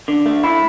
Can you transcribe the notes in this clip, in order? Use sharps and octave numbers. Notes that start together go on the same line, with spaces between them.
D3
A3
E4